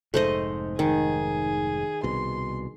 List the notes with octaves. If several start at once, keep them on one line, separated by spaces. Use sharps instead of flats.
F1 G#2 A3 C5 D#5
D#3 G#4
C2 B2 C6